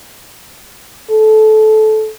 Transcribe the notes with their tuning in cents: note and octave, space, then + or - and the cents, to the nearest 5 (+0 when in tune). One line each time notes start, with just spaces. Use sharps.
A4 -20